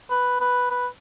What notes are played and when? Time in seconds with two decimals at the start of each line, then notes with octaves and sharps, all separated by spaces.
0.11 B4
0.41 B4
0.71 B4